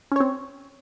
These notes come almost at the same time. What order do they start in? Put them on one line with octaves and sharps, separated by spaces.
C#4 C#5 C4